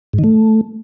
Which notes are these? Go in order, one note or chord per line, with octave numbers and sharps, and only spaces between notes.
G#2
D#3
A3